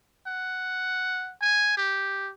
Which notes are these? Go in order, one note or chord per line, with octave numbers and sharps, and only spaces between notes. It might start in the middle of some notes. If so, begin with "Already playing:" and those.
F#5
G#5
G4